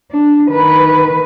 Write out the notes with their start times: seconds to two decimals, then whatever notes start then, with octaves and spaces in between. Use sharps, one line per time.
0.12 D4
0.50 D#3 B4